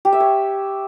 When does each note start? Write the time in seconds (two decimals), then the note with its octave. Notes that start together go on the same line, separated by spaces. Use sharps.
0.05 G4
0.13 E5
0.20 C#5